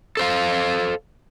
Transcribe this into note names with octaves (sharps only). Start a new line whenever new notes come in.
A4 C5 F5